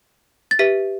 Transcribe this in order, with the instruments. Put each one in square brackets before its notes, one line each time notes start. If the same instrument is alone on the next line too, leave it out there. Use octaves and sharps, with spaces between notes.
[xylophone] A6
G4 B4 E5 B6